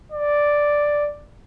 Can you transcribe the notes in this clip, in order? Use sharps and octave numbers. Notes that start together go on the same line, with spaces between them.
D5